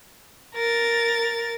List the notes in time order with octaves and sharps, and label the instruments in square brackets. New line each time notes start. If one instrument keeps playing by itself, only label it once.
[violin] A#4 A6